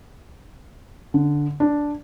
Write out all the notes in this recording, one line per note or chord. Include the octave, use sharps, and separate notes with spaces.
D3
D4